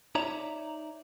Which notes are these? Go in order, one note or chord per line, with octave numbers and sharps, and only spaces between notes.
D#4 C#5 D5 E5 A#5